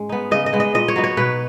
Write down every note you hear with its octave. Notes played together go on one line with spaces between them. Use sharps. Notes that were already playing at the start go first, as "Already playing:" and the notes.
Already playing: G#2 G#3 C#4
B3 D#4
C#3 D#5
D#5
G#3 B3
D#5
A#2 D#5
C#5
F#3 B3 D#4
C#5
B2 B4